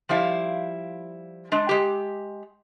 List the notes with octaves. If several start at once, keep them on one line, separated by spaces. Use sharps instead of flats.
F3 G3 E4 F5
G#3 D4
G#3 G4